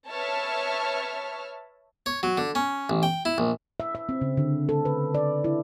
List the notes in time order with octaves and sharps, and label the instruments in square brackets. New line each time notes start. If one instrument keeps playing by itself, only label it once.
[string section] B4 C#5 E5 A5 F6
[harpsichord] C#5
F#3
D3
C#4
A1
G5
E4
A#1
[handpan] E5
E5
C4
C#3
D3
A4
B4
D5
E4